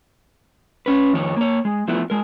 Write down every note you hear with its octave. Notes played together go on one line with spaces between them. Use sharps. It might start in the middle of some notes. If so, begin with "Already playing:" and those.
C#4 B4
F2 D#3 C#5
A#3 C#5
G#3
F3 A3 B3 E4
G#3 A#4